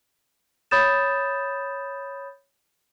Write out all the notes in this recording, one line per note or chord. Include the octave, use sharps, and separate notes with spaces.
C#5 B5 D#6 G6 A6 E7